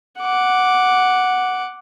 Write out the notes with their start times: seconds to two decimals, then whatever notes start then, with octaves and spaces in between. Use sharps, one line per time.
0.20 F#5 D6